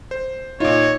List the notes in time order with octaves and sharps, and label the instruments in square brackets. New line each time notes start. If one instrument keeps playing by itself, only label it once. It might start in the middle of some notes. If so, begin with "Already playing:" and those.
[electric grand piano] C5
[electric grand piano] A#2 F4 [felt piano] D#4 [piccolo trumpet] C#5